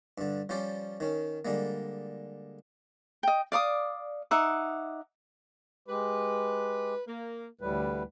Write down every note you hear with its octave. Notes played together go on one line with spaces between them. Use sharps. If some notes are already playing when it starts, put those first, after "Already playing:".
G2 D3
F3 G3 C#4 C5 D5
D#3 C#4
D3 G3 G#3 A#3
D#5 G5
D5 F5 D6 D#6
D#4 E5 F#5 D6
G#3 G4 B4
A#3
D2 A2 E3 G3 B4